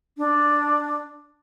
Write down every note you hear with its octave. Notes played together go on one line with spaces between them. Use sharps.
D4